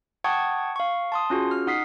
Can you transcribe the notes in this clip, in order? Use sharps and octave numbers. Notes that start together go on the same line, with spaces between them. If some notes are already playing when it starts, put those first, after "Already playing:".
F#5 G5 A5 C#6 D#6 G#6
F5 C#6
A5 C6 D#6
C#4 F4 F#4 G#4
F6
D#4 F#5 D#6 B6 C7